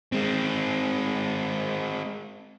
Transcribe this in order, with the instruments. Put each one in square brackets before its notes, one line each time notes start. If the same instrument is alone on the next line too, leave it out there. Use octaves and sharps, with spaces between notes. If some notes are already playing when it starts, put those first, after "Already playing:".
[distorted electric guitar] G#3 C4